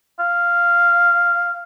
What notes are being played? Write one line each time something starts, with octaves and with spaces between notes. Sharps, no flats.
F5